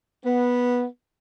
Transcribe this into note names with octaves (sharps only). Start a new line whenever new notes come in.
B3